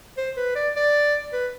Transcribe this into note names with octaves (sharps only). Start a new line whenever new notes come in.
C5
B4
D5
D5
B4